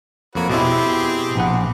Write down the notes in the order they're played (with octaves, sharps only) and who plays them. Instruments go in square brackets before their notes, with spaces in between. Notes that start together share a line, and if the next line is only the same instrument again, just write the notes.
[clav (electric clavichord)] F2 A#3 [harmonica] F#4 B4 C#5
[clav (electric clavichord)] B2 E4 [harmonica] C4 G4 G#4
[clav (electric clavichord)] A#1 B3 F#5